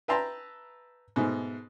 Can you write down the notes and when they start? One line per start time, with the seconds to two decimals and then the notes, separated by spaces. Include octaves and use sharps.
0.08 B4 E5 G5 A5 A#5 C6
1.16 G#2 B2 A3